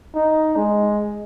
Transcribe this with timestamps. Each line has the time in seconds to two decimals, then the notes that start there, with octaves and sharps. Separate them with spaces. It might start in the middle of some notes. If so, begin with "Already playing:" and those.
0.15 D#4
0.56 G#3